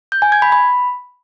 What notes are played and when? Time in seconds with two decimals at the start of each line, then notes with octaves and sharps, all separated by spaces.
0.12 G6
0.22 G#5
0.32 G#6
0.42 B5
0.52 B5